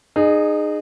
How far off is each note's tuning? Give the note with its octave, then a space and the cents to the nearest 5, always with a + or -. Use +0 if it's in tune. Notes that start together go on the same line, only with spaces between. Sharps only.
D#4 -30 G#4 +0